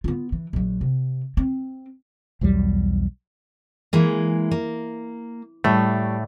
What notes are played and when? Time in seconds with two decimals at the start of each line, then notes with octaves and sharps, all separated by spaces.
0.04 B3 F4
0.32 E3
0.53 A#1 F#3
0.81 C3
1.37 C4
2.41 B1 E2 F#3 G3
3.93 E3 G#3 A#3
4.51 A#3
5.64 A2 G3 A3